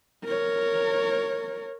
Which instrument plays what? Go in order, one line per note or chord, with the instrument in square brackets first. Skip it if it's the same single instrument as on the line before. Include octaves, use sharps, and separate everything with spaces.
[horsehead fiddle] A#4 C#5